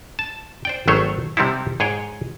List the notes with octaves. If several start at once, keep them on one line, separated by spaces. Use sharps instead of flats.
A5
C5 D5 G5
G#1 D#3 F#3 A3 C5 C#5
C3 G3 C4 D#4 E4
G#2 G#4 C#5 G5